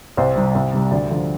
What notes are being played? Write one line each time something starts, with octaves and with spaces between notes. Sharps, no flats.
C2 C5
C3 G3
C2
C3 G3
D2 D5
D3 F3